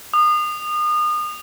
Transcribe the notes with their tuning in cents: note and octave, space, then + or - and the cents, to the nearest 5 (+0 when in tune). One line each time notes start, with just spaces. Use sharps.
D#6 -35